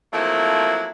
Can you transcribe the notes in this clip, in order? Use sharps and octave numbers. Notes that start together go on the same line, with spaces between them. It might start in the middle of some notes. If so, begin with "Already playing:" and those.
F3 F#3 A3 A#3 C4 E4